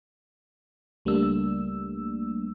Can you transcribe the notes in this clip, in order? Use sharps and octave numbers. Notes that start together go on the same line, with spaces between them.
C#2 G3 A3 A#3 D4 E6